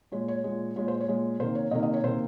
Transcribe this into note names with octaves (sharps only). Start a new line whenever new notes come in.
A#2 G#3 C#5
C#5
A#2 G#3
A#2 G#3 C#5
C5
C#5
A#2 G#3
C3 D#3 A#3 C5
C#5
C3 D#3 A#3 D#5
D#5
C#5
C3 D#3 A#3 C5